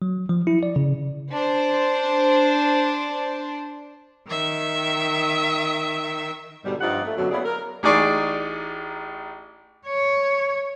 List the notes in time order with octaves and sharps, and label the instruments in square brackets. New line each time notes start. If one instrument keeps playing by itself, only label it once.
[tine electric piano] F#3
F3
E4
D5
C#3
[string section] D4 C5
[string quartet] D#3 E5
[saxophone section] G#2 B2 D3 G3
G2 F3 D#4 F4 D5 F#5
A3
F#2 B2 D3 F#3
A#3 B3 E4 G#4 C#5 D5
A#4
[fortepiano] A1 D#4 G#4 D5 C#6
[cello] C#5